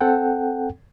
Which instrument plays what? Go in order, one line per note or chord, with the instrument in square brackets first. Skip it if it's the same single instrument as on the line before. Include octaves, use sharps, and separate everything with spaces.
[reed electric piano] C4 A4 F#5 G5